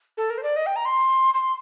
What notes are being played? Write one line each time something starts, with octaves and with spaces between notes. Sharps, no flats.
A4
A#4
C5
D5
D#5
G5
A#5
C6
C6